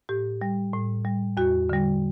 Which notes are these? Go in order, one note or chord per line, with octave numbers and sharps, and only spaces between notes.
A2 G4
G3
A2
G3
E2 F#4
D3 G3